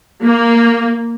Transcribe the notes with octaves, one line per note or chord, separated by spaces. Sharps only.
A#3